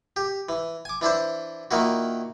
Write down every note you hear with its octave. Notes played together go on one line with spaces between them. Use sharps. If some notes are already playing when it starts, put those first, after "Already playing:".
G4
E3
G#5 D6
E3 D4 E4 C5
A#2 D#3 A#3 E4 F#4